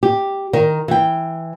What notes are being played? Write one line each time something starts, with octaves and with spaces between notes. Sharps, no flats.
G4
D#3 A#4
E3 G5